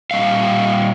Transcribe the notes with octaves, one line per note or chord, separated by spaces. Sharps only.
A#2 G3 D#5 F5